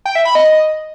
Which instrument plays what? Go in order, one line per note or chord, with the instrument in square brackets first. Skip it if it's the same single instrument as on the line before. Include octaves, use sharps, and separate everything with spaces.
[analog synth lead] G5
E5
B5
D#5